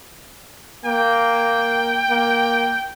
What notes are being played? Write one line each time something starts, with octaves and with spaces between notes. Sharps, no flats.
A#3 G5
A#3